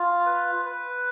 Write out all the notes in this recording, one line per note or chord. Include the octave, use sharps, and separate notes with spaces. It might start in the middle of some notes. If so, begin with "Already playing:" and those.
Already playing: F4
B4
B4